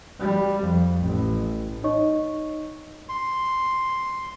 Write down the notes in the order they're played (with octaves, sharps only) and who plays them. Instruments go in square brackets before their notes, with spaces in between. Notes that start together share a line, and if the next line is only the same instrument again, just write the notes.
[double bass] G3
F2
A1
[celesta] D#4 C#5 D#5 C#6
[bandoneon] C6